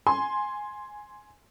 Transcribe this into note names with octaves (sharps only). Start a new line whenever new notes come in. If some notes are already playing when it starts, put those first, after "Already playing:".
G#5 C6